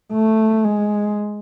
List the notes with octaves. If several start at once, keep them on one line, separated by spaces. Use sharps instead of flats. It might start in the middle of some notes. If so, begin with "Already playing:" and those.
A3
G#3